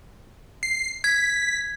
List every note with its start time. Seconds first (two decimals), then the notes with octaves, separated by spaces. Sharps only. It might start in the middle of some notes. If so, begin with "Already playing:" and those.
0.63 C7
1.04 G#6 B6